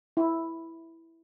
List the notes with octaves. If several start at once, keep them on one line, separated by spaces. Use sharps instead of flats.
E4